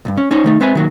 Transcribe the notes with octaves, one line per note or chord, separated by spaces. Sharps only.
C2 G2
C#4
C#4 D#4 C5 C#5
D#3 A3 D#4
G#3 C4 B4 E5 G#5 B5
D#3 F#3 A#3